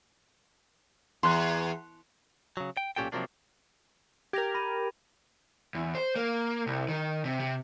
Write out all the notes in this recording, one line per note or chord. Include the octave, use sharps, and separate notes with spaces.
E2 C6 F#6
C#3 F#3
G5
B1 A#2 C#4 G4 A4 G5
C3 D#3 F3 F#3 A#3 D4
G4 A#4 G#6 A#6 F7
B5 A#6 D#7
E2
C5
A#3
C2
D#3
C3
C3